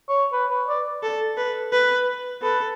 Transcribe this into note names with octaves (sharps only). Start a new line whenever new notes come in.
C#5
B4
B4
D5
A4
B4
B4
A4 B4